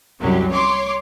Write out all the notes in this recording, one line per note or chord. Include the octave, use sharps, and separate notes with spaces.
C2 F#2 F#3 G4
C#5 C6 D6